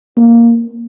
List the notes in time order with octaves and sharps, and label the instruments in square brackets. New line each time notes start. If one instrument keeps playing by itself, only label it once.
[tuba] A#3